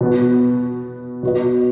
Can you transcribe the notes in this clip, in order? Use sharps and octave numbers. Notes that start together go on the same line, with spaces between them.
B2 B3 F#4
B2 B3 F#4 B4 D#5